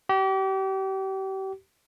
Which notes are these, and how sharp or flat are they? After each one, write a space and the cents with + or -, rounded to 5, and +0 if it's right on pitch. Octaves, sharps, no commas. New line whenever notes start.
G4 -35